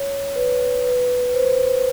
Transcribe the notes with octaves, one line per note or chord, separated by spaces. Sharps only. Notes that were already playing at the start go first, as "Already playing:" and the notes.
Already playing: C#5
B4
B4
B4
C5